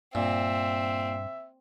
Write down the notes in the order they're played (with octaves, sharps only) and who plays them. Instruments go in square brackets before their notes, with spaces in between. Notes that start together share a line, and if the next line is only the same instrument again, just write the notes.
[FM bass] G2 [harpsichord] A#2 [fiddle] C4 [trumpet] E5